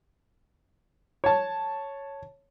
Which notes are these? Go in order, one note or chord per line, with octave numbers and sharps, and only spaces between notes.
C#5 A5